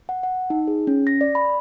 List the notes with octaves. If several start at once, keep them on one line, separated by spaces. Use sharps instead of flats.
F#5
F#5
D#4
G#4
C#4
A#6
D5
B5